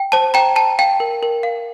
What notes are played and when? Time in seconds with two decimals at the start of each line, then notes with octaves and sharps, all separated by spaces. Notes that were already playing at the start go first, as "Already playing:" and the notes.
Already playing: G5
0.12 C5 A5
0.34 G5 A#5
0.56 G5 A5
0.79 F5 G5
1.00 A#4
1.23 A#4
1.43 F5